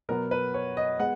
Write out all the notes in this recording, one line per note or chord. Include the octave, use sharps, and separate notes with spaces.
B2 F#3 B3 A#4
B4
C#5
D#5
G#3 B3 F#5